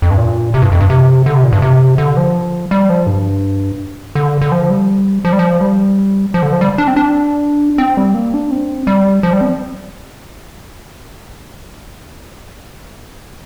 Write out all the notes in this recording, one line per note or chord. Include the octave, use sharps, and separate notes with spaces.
F2
G2
A#2
C3
G2
F2
G2
C3
D3
C3
A#2
G2
C3
D3
F3
G3
F3
G2
D3
D3
F3
G3
F3
G3
F3
G3
F3
D3
F3
G3
D4
C4
D4
C4
G3
A#3
D4
C4
G3
F3
G3
C4